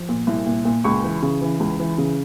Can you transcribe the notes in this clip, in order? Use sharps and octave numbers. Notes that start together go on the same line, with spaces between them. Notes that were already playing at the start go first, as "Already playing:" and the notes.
Already playing: F3
A#2
C2
A#2
A#2
C#2 C#6
E3
C#3
E3
C#2
E3
C#3